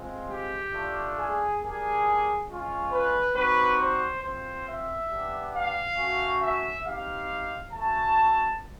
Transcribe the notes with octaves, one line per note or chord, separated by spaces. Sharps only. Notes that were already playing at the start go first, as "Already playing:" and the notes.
Already playing: G#3 C4 F4
G4
A3 D4 F4
G#4
A#3 D4 G4 G#4
G#3 C#4 F4
B4
G3 C4 D#4 F#4 B4
C5
C4 F4 C5
E5
B3 D4 G4
F5
A3 C#4 F#4
E5
C4 D#4 G4 F5
A3 C#4 F#4 A5